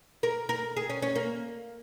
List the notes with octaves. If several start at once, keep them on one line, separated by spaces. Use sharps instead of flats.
A#4
A#4
G#4
C#4
C#4
A#3